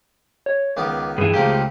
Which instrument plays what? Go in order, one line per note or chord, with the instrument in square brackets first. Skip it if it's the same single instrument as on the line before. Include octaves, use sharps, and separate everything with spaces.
[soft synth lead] C#5
[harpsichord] C#2 D#3 B3 [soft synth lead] D6
[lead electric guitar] G2 E3 [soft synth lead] G#4
[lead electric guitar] C#2 G4 [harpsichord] A3 A#3 C4